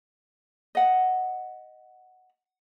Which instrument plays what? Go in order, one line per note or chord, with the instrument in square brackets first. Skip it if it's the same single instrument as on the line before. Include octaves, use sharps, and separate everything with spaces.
[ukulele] D#5 F#5